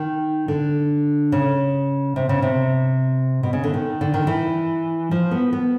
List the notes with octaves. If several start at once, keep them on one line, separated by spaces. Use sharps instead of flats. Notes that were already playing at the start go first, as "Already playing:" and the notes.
Already playing: D#3
D3
C#3
C3
C#3
C3
B2
C#3
D3
D#3
D3
D#3
E3
F3
B3
B3